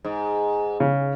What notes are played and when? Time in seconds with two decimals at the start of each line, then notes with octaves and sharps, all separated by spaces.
0.05 G#2
0.80 C#3